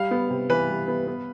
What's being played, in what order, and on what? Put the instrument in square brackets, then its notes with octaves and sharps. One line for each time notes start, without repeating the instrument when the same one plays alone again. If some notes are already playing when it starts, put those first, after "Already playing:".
Already playing: [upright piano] G3 [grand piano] F5
[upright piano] B3
C3
[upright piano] E3 [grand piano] B4
[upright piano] G3
B3
B3